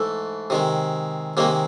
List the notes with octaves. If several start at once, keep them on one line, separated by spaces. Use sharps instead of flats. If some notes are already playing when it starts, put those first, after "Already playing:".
Already playing: G#2 E3 A3
C3 D#3 G#3
C3 D#3 G#3 A#3